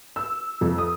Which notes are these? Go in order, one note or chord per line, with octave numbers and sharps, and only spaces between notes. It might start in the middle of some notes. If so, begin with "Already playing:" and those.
E6
F2
D#6